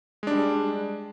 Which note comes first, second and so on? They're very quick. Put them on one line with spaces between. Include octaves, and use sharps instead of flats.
G#3 D4 G3